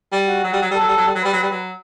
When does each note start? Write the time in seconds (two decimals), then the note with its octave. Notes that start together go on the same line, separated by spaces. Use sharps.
0.12 G3
0.28 F#4
0.44 F#3
0.53 G3
0.62 F#3
0.71 G3
0.75 F#3 A4
0.88 G3
0.97 F#3
1.06 G3
1.15 F#3
1.23 G3 B4
1.33 F#3
1.43 G3
1.51 F#3